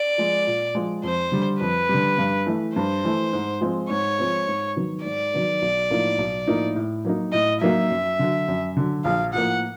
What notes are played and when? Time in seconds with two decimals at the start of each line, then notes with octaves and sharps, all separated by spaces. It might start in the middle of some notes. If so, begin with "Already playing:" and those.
Already playing: D5
0.18 F3 G#3
0.47 A#2
0.75 F3 G#3
1.03 F2 C5
1.32 D3 G3
1.61 F2 B4
1.89 D3 G3
2.18 G2
2.46 E3 A3
2.75 G2 C5
3.05 E3 A3
3.33 G#2
3.61 F3 G#3 C4
3.90 G#2 C#5
4.19 F3 G#3 C4
4.48 G#2
4.76 D#3 F#3 B3
5.05 G#2 D5
5.33 D#3 F#3 B3
5.62 B1
5.90 A2 F3 A#3 D#4
6.18 B1
6.47 A2 F3 A#3 D#4
6.76 A2
7.05 F#3 A#3 D#4
7.33 A2 D#5
7.61 F#3 A#3 D#4 E5
7.91 F#2
8.19 D3 F#3
8.48 F#2
8.77 D3 F#3
9.05 A#1 F5
9.34 A2 F3 A#3 F#5